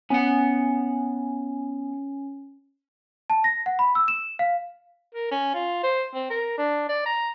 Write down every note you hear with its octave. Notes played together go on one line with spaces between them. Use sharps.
B3 C#4 F#5
A5
A#6
F#5
B5
E6
E7
F5
A#4
C#4
F4
C5
C4
A#4
D4
D5
A#5